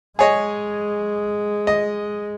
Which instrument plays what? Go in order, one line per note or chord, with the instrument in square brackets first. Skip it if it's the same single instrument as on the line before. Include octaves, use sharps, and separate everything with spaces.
[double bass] G#3 [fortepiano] G#4 C#5 D#5
[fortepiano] D#5